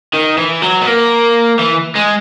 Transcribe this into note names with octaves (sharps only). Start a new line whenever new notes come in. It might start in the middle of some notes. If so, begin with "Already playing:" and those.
D#3
E3
F#3
B3
A#3
E3
G#3